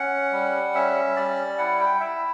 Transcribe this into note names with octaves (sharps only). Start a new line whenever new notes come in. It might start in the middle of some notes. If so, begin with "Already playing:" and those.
Already playing: C#4 F#5
G3
C#4 E5
G3 D5
E4 F#5
G5
E4 E5